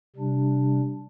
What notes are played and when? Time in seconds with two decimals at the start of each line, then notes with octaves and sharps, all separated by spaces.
0.16 C3 G3 D4